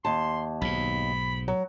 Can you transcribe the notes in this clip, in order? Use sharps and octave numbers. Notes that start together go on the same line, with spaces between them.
D#2 A5 C6
B1 G#2 B5
F#3